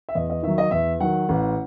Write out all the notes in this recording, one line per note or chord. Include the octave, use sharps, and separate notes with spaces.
E5
E2 D#5
D#5
D#3 F#3 E5
D#5
E2 E5
D#3 F#3 F#5
A1